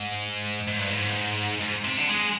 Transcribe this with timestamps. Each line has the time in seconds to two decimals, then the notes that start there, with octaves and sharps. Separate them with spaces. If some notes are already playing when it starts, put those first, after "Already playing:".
Already playing: G#2
0.68 G#2
0.78 G2
0.90 G#2
1.61 G#2
1.85 C3
1.97 D3
2.09 G#3